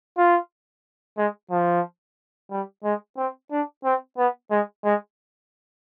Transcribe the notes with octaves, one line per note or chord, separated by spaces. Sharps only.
F4
G#3
F3
G3
G#3
C4
D4
C4
B3
G#3
G#3